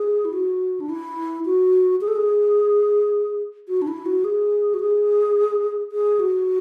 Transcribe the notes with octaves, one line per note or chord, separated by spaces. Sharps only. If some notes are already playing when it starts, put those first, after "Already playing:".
Already playing: G#4
E4
F#4
D4
E4
F#4
G#4
A4
G#4
F#4
D4
E4
F#4
G#4
F#4
G#4
G#4
F#4